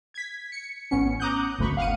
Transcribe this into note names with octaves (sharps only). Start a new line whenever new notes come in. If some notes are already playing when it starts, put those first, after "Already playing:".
G#6 B6
C#7
A1 B3 C#4 C#7
A#5 D6 D#6 F#6 G6
G1 D2 B5 C#6
F5 F#5 C#7 D#7